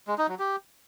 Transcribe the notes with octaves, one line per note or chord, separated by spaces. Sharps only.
G#3
D#4
F#3
G4